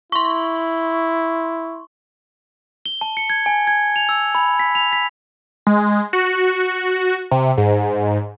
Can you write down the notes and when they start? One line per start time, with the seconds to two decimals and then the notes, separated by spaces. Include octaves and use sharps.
0.12 E4 C6 C#6
2.86 G7
3.01 A5
3.17 C#7
3.30 G#6
3.46 G#5
3.67 G#6
3.96 F7
4.09 E6
4.35 B5
4.59 B6
4.75 F7
4.93 B6
5.67 G#3
6.13 F#4
7.31 C3
7.58 G#2